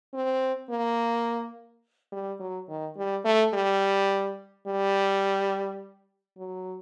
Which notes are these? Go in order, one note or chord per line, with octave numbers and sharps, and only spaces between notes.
C4
A#3
G3
F#3
D#3
G3
A3
G3
G3
F#3